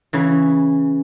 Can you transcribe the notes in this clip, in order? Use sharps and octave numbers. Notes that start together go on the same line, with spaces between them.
C#3 E3